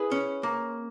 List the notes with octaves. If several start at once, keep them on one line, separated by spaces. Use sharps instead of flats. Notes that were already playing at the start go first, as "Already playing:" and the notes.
Already playing: E4 G#4 B4
C#4
A#3